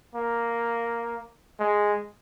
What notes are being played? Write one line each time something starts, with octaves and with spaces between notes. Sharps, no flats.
A#3
G#3